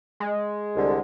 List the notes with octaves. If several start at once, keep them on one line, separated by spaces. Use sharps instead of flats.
G#3
C2 D3